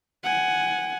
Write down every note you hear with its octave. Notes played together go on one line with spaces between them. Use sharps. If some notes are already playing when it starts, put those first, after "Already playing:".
F#5 G#5